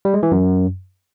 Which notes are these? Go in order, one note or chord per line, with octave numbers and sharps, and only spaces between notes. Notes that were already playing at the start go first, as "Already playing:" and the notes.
G3
G#3
E3
F#2